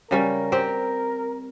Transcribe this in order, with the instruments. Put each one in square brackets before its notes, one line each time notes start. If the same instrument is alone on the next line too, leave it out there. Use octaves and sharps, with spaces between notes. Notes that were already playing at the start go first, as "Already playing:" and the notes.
[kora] C#3 G3 C#4 [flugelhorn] A#4
[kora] C4 G4